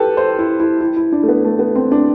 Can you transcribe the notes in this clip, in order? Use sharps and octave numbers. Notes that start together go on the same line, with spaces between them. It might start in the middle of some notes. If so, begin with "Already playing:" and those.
Already playing: G4 A4 B4
C5
E4
E4
E4
E4
D4
A3
B3
A3
B3
C4
D4